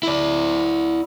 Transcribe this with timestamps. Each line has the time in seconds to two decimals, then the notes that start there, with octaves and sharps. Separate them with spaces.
0.03 E4 D5